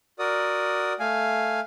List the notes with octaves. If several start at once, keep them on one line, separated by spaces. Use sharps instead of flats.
F#4 A#4 D5 D#6
A3 F5 G#5